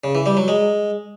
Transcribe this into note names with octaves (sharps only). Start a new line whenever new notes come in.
C#3
E3
G3
F#3
G#3